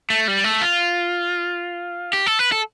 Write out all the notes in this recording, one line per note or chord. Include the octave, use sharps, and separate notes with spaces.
A3
G3
A3
F4
G4
A4
B4
A4